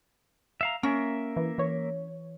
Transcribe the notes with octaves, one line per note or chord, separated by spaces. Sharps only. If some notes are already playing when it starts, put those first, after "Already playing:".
E5 F5 A#5
A#3 C#4 A#4 E5
E3
E3 C#5